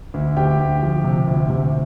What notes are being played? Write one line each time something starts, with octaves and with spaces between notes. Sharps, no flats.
D2
D2 G4 G5
D2
F3
C3
D2
C3